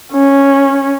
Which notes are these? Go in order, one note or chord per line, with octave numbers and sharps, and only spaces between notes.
C#4